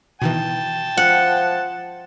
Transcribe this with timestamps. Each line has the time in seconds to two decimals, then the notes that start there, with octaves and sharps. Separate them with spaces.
0.22 B2 D#3 E3 G5 A5
0.97 F3 F#5